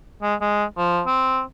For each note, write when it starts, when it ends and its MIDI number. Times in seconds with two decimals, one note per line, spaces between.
0.22 0.35 56
0.41 0.64 56
0.77 1.01 53
1.06 1.42 60